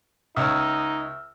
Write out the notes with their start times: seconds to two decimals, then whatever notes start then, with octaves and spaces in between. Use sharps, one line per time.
0.36 C#2 D#4 C#5 E5 E6 F6